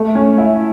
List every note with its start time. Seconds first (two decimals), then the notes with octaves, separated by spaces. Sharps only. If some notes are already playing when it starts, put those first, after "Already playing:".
Already playing: A3
0.15 C#4
0.38 E4